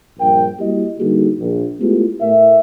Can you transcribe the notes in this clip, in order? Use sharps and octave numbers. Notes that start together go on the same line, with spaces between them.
A#1 G2 A#4 G5
G3 A#3 E4 F#4 G4 D#5
D3 G3 A#3 D#4 F#4 G#4
A#1
G#3 A3 B3 E4 F4 G4
A2 A3 A#4 E5